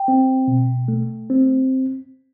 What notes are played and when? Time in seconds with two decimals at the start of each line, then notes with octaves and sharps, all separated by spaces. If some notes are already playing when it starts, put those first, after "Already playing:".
Already playing: G5
0.08 C4
0.48 B2
0.88 A3
1.30 C4